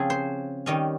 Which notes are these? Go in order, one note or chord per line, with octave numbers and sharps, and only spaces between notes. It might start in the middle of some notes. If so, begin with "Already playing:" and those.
Already playing: C#3 F3 C4 G#4
C5
D#3 G3 C#4 D#5